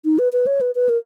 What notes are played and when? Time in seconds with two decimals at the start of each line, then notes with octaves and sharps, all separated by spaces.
0.05 D#4
0.19 B4
0.33 B4
0.47 C#5
0.61 B4
0.75 B4
0.89 A#4